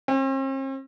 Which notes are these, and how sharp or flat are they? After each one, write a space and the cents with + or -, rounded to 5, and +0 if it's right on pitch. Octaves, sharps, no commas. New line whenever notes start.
C4 +45